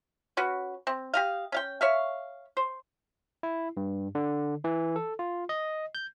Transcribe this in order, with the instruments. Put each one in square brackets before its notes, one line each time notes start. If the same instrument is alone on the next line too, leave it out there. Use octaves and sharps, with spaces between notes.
[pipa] C#4 F#4 B4
C4
G4 D#5 F5
C#4 F5 G5
C#5 E5 F5
C5
[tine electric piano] E4
G2
D3
E3
A4
F4
D#5
G6